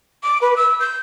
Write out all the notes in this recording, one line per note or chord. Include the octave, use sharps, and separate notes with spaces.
D6
B4
E6
G6